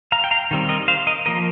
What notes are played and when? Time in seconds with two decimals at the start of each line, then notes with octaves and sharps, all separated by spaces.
0.12 F5 A#5
0.24 G5
0.31 F5 A#5
0.51 D#3 G3 C4
0.69 A#4 D#5
0.88 C5 F5
1.07 A#4 D#5
1.26 F3 A#3 A#4 D#5